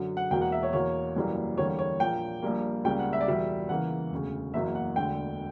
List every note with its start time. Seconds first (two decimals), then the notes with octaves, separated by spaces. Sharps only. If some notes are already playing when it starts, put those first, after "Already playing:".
Already playing: F#2 D3 F#3
0.17 F#5
0.31 E1 E2 B2 F#3 A#3 G5
0.41 F#5
0.52 E5
0.63 C#5
0.73 E2 B2 A#3 C#5
1.16 F#1 F#2 E3 G3 A#3
1.57 E2 D3 G3 A#3 C#5
1.79 C#5
2.00 A#1 A#2 A#3 G5
2.42 A#1 A#2 G3 A#3
2.85 C#2 C#3 G3 A#3 G5
2.99 F#5
3.13 E5
3.21 D5
3.27 E2 B2 G3 A#3 E5
3.69 E2 C#3 E3 A#3 F#5
4.11 E1 D2 C#3
4.54 F#1 E2 B2 F#3 A#3 E5
4.75 F#5
4.96 E1 D2 D3 G5